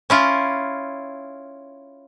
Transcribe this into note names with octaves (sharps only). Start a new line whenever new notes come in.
C#4 E4 F4